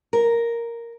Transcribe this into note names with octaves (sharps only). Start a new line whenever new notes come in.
A#4